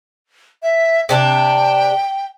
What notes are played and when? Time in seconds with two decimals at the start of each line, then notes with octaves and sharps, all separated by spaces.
0.63 E5
1.09 C3 D4 G5 A5